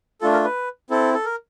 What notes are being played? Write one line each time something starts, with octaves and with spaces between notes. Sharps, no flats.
A3 D4 F4 A4
A#4
B4
C4 E4 A4
A4
A#4